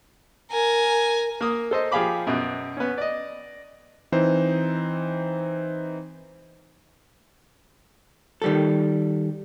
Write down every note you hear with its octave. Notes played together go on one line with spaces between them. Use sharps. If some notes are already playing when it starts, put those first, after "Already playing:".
A#4 G#5
A#3 D#6
A4 C5 D#5
F3 G4 G#4 F5 B5 D6
F#2 B2
B3 C#4
D5 D#5
E3 C4 D#4 C5
D#3 G3 A4